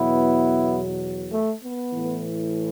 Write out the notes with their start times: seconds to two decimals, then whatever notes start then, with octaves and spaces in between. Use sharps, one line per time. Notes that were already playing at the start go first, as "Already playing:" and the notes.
Already playing: E2 B2 F#3 B3 E4
1.31 A3
1.62 B3
1.92 A2 E3